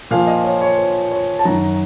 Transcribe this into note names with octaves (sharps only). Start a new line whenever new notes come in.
A#2 F3 F5
D#5
C#5
C#5
C5
C#5
A5
F#2 D#3 F#3 A#5